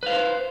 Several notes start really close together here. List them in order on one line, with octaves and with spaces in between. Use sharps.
B4 F5 C5